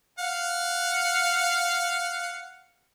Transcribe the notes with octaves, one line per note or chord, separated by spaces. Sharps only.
F5 F#5